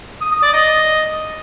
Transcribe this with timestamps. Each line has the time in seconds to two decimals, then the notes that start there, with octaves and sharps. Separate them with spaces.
0.21 D#6
0.32 D#6
0.43 D5
0.53 D#5